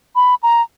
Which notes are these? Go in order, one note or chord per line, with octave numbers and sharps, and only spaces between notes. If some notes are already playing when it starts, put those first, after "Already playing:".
B5
A#5